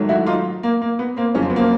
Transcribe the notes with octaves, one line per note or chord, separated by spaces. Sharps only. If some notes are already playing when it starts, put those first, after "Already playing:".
Already playing: G#2 D#3 F#3 A3
E4 F#4
D#4 F4
A#3
A#3
B3
A#3 C4
F2 C#3 F#3 C#4
C4
B3
A#3 C4